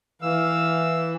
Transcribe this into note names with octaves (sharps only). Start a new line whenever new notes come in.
E3 F5 E6